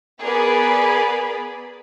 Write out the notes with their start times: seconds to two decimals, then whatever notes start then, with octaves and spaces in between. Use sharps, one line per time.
0.22 B3 G#4 A#4 D5 B5